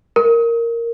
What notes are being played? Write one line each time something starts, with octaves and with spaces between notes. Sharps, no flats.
A#4